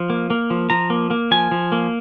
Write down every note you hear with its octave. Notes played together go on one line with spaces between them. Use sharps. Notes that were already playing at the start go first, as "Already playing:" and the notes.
Already playing: F3
A#3
A#3
F3
F3 A#5
A#3
A#3
F3 G#5
F3
A#3